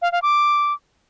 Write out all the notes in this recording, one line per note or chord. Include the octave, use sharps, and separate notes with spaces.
F5
F5
D6